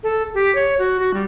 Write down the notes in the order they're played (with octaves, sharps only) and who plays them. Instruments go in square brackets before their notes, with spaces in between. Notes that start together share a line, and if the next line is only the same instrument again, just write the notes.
[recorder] A4
G4
C#5
F#4
F#4
G3